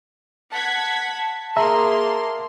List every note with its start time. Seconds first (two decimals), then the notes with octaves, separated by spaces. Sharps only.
0.52 F#5 A5 G#6 B6
1.57 A#3 G#4 E5 A#5 C6